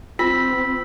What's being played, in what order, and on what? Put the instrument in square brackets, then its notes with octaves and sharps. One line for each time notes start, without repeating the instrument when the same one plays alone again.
[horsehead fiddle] C4 [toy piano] F4 [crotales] E6 [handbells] B6